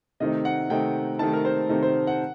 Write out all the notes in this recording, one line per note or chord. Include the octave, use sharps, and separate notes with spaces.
C3 D#3 A3 C4 D#4 D#5
F#5
C3 D#3 A3 C4 D#4 G5
C3 D#3 A3 C4 D#4 A5
A#4
C5
C3 D#3 A3 C4 D#4
C5
F#5